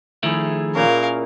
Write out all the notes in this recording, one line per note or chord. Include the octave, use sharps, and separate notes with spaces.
D#3 F3 A3 E4 G#4
A#2 C#4 A#4 F5